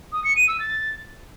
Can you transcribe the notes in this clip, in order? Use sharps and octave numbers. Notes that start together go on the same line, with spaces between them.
D#6
C#7
D#7
E6
A6